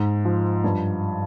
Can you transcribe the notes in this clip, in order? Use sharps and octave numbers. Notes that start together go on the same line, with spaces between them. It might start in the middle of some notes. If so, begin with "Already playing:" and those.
Already playing: G#2
F3
G2